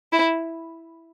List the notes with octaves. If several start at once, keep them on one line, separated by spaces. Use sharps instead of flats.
E4